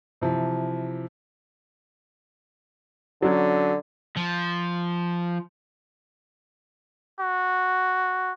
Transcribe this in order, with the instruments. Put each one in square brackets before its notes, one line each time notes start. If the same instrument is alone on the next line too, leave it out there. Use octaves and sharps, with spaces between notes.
[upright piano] C3 E3 F3
[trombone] D3 [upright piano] F#3 C#4
[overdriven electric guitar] F3
[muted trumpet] F#4